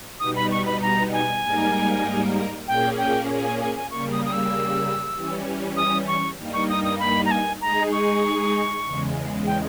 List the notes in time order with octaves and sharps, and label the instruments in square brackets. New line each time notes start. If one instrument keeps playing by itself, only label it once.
[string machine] B2 G3 B3 D#4 [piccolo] D#6
[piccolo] B5
C#6
B5
A#5
G#5
[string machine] G#2 G3 A#3 D#4 A#4
[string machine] A#2 A#3 C#4 G#4 [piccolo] G5
[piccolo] G5
G#5
G#5
G#5
[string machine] C#3 G3 A#3 [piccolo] C#6
[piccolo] D#6
D#6
E6
[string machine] E3 G3 C#4
[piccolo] D#6
C#6
[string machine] G2 G3 A#3 D#4
[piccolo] C#6
D#6
D#6
B5
A#5
G#5
[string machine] G#3 D#4 G#4 [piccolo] A#5
[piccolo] C#6
[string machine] E2 C#3 G#3
[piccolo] G5